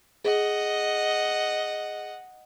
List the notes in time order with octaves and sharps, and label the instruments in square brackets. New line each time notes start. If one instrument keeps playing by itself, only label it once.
[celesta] G#4 [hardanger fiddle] D#5 F#5